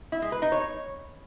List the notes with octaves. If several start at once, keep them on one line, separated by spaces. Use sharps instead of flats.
E4
G#3
B4
D#4
C#5